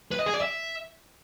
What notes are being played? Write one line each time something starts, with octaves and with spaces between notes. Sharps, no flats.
B4
D#5
G#4
D5
E5